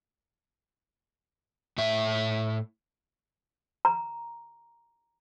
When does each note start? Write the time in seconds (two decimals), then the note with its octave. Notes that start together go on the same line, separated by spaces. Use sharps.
1.78 A2 E5
3.85 A#5